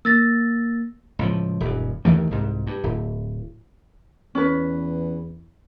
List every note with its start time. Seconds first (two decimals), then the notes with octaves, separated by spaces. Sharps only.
0.05 A#3 E6 A6 A#6
1.19 C#2 A2 F3
1.61 D#1 F#2
2.05 D#2 D#3 E3 A3
2.31 C2 G#2
2.67 G2
2.84 D1
4.35 E2 C#4 B4